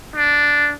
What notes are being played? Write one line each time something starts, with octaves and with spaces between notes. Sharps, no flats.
D4